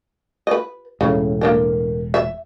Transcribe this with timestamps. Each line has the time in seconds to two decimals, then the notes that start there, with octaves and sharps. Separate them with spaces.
0.47 B4 D#5
1.01 E1 A2 C#3
1.41 A#3 D4 A#4
2.14 E5